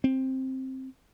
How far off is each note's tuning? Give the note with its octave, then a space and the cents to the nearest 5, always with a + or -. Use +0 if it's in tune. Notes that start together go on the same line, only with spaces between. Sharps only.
C4 +10